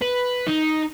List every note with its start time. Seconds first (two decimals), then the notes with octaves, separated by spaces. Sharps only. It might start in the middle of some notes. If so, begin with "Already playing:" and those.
0.02 B4
0.47 D#4